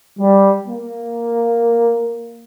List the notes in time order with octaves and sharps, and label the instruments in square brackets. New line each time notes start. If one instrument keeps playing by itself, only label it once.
[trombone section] G3
A#3